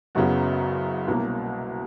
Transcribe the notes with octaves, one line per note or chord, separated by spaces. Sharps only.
F#1 F#2 C#3 F#3 B3 F#4
C2 B2 F#3 A#3